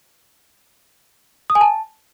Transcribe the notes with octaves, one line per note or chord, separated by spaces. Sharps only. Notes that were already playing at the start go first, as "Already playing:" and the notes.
D#6
G#5
A5